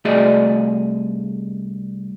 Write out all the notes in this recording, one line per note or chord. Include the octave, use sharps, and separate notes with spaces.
C2 A3 F#4 G#4 D5 D#5